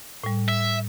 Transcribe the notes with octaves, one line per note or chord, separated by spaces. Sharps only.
A2 G3
E5